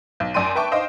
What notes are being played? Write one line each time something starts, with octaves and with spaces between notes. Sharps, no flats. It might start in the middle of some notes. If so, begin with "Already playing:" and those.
B1
F#2 D5 G5 C6 D#7
B4 E5 G5 A5 C#6 D6
C5 D#5 F5 G5 C6